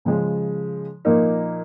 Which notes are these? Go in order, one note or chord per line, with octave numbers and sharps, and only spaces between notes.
C#3 F3 G#3
A#2 F3 A#3 D#4 A#4